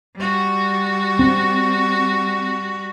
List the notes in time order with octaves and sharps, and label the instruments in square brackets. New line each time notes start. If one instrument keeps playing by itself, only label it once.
[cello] G3 F#4
[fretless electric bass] C4